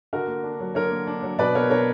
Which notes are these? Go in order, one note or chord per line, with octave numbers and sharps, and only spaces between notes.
D3 F#4 A#4
A#3
D4
F#3
D3 A#4 C#5
A#3
D4
F#3
B2 B4 D5
B3 A#4 C#5
D4 A#4 C#5